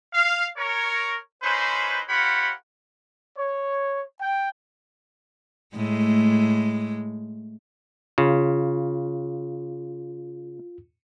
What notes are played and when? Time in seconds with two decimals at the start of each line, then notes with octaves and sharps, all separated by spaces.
0.14 F5
0.57 A#4 C#5
1.43 C#4 D#4 E4 B4 C5
2.09 F4 G4 A#4 C#5 F#5 B5
3.36 C#5
4.19 G5
5.75 A2 G#3 A3
8.18 C#3 F4